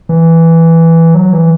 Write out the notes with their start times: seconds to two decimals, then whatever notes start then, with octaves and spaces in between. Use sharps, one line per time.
0.09 E3
1.15 F#3
1.33 E3